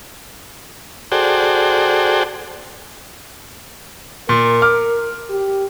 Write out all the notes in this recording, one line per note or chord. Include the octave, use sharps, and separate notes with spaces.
F#4 G#4 A4 C5 D5 G5
A#2 A#4
D6 F6
G4